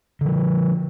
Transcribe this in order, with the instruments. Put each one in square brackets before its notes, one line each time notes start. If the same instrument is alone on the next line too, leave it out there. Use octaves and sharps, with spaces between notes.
[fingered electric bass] D3 F3